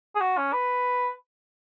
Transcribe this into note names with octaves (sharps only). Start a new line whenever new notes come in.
G#4
F#4
C#4
B4